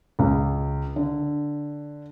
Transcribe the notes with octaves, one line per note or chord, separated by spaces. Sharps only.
C#2
D3